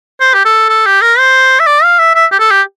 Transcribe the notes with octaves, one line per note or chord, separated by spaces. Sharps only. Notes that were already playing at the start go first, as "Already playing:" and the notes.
C5
G4
A4
A4
G4
A#4
C5
E5
D5
F5
E5
E5
G4
A4
G4